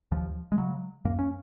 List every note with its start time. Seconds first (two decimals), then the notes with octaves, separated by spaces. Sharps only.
0.12 D#2 F3
0.52 G#3
0.58 C#3 F#3
1.05 F#2 A#3
1.19 C#4